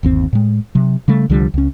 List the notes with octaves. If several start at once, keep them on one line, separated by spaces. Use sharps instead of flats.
G1 D#2 C4
A2 G#3
C3 F#3
C#3 G3 A3
C2 D3 F3 G3
C#2 C#4